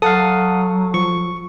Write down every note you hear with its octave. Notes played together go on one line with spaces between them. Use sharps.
F#3 A4 F5 F#5 A5 D#6
F3 C#6